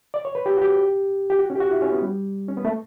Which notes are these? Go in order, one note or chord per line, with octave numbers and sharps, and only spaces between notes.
D5
C#5
B4
G4
F#4
G4
G4
F#4
C#4
G4
F#4
E4
C#4
B3
G3
C#4
B3
A3